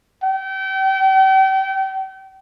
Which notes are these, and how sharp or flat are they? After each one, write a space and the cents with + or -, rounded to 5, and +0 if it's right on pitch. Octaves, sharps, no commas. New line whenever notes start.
G5 -35